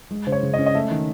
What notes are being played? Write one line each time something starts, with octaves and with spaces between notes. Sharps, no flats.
G#3
C#3 C5
C#5
C#3
D#5
C#4
D#5
A3 E5
D#3